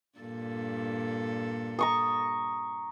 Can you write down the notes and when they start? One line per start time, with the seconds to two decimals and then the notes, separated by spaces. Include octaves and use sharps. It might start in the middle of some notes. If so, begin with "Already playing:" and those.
0.18 G2 A#2 A4
1.79 A#5 C#6 D#6